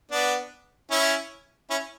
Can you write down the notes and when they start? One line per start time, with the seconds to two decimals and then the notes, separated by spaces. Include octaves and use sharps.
0.11 B3 D4
0.91 C#4 E4
1.70 C#4 E4